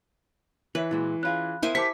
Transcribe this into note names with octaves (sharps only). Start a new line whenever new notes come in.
E3 B4 C#5 E5
A#2 G#3 E4 F#4
C#4 F4 G#4 F5 B5 F#6
B3 E4 A#4 C5 G#5
G4 A#4 C5 A5 C#6 D6 B6